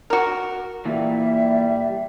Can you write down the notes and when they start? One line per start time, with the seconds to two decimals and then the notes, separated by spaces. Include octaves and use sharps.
0.10 F#4 A#4
0.85 A#2 E3 G3 E5